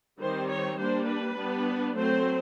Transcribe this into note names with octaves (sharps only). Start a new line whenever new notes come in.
D#3 G3 C4 C5
C#5
G3 A#3 D4 C5
B4
G3 B3 D4
F#3 A3 C4 C5